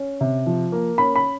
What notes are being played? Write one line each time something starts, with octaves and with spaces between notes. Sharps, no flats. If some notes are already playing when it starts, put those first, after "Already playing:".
Already playing: C#4
C3
F3
A#3
C#4 B5
B5